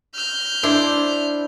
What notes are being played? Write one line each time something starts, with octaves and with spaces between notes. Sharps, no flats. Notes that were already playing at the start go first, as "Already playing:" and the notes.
F6 G6
D4 E4 C5